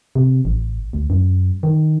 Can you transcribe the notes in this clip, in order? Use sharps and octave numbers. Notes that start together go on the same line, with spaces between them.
C3
A1
D2
F#2
D#3